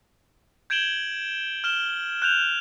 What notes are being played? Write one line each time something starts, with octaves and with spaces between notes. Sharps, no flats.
G6 G#6 D7 E7 F#7 G7
F6 E7 G7
F#6 G6 F7